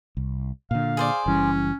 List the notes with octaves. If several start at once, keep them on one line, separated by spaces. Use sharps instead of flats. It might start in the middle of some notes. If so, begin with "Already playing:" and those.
C2
A#2 D3 F5
G#4 C5 D5
F#1 E3 G3 C#4